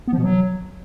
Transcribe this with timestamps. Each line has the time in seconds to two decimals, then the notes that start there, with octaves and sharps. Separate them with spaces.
0.08 B3
0.13 F3
0.18 B2
0.23 F#3